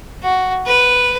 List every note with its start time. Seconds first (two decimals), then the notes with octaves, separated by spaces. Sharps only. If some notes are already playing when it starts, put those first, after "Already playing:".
0.22 F#4
0.66 B4